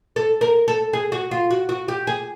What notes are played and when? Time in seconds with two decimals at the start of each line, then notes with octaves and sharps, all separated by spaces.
0.16 A4
0.41 A#4
0.68 A4
0.93 G#4
1.12 F#4
1.31 F4
1.50 F#4
1.69 F#4
1.88 G4
2.07 G#4